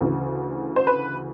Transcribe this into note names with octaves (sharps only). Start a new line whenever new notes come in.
D2 C#3 E3
C5
B4